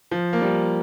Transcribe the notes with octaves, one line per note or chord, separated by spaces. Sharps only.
F3
A#3
G3